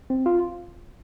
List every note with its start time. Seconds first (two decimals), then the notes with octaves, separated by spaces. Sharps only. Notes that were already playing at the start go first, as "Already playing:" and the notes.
0.10 C4
0.26 F4